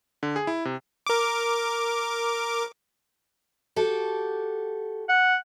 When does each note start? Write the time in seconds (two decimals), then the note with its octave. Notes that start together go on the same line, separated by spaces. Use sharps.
0.23 D3
0.36 G#4
0.47 E4
0.65 C3
1.07 A#4 D6
3.76 F#4 G4 A4
5.09 F#5